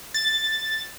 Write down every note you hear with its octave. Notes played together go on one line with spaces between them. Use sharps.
A6